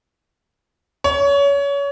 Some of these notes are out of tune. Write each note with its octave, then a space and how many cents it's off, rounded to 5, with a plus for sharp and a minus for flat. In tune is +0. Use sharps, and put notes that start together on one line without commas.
C#5 +25